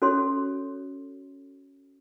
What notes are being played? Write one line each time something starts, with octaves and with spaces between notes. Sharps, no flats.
C#4 F#4 A4 C#5 C6